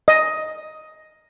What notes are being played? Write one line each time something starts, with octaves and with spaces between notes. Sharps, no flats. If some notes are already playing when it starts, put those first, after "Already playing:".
D#5